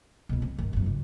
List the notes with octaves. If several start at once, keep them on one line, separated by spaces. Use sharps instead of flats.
C#2 B2
C4
G2 D#3
G1 F#2
C#2